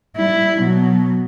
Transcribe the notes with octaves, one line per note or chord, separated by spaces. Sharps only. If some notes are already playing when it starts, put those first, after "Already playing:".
G3 E4
B2 F#3